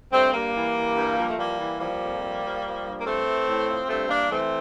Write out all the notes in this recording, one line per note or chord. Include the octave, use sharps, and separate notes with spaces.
G2 A3 C4
G2 G3 A#3
E3
E3
G2
F3 G3
A3
E3 G3 A#3
E3
F3 G3 A#3
F2
C3
F3
F3
G2
A#3
E3 A3 C4
E3
A2
F3
G2 A3 C4
E3 A#3 D4
E3 A3 C4